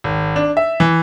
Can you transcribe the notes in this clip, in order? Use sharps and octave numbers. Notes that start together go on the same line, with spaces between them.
G#1
D4
E5
E3